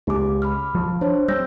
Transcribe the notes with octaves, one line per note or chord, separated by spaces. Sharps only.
C#2 G4 D6
B5 D6 F6
F3
D4 C5 C#5
G3 C4 E6 G6 A#6